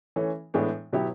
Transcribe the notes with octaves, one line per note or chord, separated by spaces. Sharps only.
E3 A3 C#4
A2 E3 G#3 B3 D4
B2 F#3 B3 E4 G4